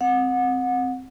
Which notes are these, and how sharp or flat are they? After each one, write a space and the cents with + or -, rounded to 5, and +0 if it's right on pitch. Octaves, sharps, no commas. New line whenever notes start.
C4 +0 F#5 -30